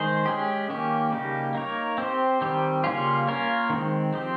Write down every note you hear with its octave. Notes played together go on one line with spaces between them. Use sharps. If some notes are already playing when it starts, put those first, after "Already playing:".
Already playing: D#3 G#3 G#4 C5
G#3 C#4 G4
D#3 A#3 C#4 G4
C#3 G3 A#3 D#4 G4
A#3 D#4 A#4 C#5
C4 G4 C5
D#3 G3 C4 G4
C#3 G3 A#3 C#4 F4
A#3 C#4 F4 A#4 C#5
D#3 G#3 C4
F3 C4 G4 C5